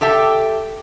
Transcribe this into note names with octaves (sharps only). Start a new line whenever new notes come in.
G4 A4 E5 G5